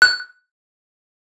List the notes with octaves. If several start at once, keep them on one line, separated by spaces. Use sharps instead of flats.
F#6